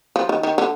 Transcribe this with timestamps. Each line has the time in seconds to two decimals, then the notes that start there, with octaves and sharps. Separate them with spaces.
0.16 F3
0.29 D#3
0.43 D#3
0.58 D3